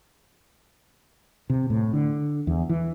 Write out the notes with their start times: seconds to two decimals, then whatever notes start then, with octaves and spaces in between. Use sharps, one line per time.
1.50 C3
1.70 A2
1.93 D3
2.47 E2
2.69 E3